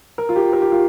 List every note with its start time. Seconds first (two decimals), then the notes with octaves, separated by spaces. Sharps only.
0.18 A#4
0.29 F4
0.36 G4
0.53 A#4
0.62 G4
0.72 F4